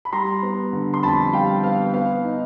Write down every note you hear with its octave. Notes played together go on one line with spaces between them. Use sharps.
B5
G3 A#5 C6
B3
D3
C6
F2 A5 B5
G3 F5 G5
B3 F5
B3 F5
D#4